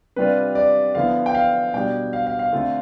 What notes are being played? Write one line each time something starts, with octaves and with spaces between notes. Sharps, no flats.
C3 G3 D4 F4 B4
D5
D3 F3 B3 E4 F5
G5
F5
B2 G3 D4 G5
F5
F5
F5
D3 A3 C4 F4